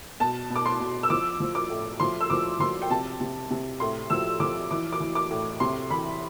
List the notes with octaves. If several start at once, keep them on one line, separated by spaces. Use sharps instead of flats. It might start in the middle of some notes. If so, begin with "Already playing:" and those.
B2 A5
B2
D6
C6
B2
E6
F3 D6
F3
D6
A2
F3 C6
E6
F3 D6
F3 C6
G5
C3 A5
C3
C3
A2 C6
F3 E6
F3 D6
E3 D6
D6
E3
D6
A2
C3 C6
E3 B5